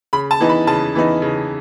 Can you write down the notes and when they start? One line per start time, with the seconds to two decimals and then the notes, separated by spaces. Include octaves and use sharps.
0.13 C#3 B5
0.31 A5
0.40 E3 B3 D#4
0.49 B5
0.67 C#3 A5
0.95 E3 B3 D#4
1.22 C#3